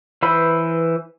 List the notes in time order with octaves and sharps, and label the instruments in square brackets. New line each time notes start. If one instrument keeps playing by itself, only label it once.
[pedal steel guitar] E3 B4 C5 B5 E6